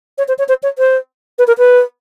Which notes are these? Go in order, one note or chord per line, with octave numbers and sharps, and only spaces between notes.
C#5
C5
C#5
C5
C#5
C5
B4
A#4
B4